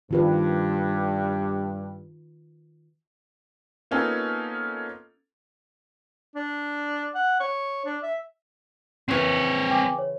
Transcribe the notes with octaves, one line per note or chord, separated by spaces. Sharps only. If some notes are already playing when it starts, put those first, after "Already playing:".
G2 D#3 F4 B4
A#3 B3 C#4 D#4 F4 A4
D4
F#5
C#5
D4
E5
C#3 E3 C4 A#4 C#5
G5 G#5 D6
C#5